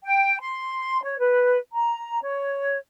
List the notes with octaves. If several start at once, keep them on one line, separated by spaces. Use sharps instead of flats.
G5
C6
C#5
B4
A#5
C#5